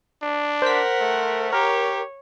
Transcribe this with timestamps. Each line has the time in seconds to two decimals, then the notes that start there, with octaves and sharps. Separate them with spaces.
0.22 D4
0.62 A#4 C5 F#5 B6
1.01 A3
1.53 G4 A#4 C#5